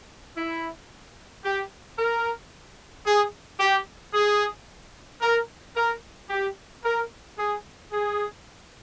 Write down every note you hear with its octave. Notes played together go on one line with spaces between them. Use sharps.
E4
G4
A#4
G#4
G4
G#4
A#4
A#4
G4
A#4
G#4
G#4